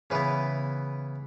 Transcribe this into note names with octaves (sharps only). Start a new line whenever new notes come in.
C#3 E3 B3 B4